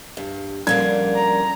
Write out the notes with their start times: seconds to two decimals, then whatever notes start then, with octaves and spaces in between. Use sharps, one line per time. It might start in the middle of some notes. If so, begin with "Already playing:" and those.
0.17 G2
0.67 A#2 D3 F3 G3 A#3 C#4 G#6
1.16 A#5